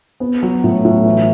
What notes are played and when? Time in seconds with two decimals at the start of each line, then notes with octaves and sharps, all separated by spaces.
0.20 B3
0.43 F#3
0.64 A2
0.85 A2
1.05 E3